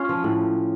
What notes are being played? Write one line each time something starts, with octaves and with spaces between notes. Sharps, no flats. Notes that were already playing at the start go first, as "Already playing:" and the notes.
Already playing: C#4 F4
F3
A2